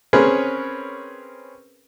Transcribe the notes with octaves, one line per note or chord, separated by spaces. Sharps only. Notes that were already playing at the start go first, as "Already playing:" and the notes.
C4 C#4 G#4 A#4 B4 C#5